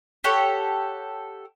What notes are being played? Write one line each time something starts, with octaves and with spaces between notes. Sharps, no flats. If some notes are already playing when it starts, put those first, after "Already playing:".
G4 A4 C#5 F#5